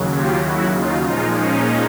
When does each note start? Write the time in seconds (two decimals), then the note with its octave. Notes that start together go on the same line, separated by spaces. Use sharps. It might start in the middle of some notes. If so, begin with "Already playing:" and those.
Already playing: D#2 C#3 F#3
0.14 F4 G4
0.44 E4 F#4
0.74 D#4 F4
1.04 A#2 F3 G#3 D#4 F4
1.34 C#4 D#4